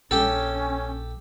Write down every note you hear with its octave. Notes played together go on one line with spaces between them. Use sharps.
A#1 C#4 G4 A4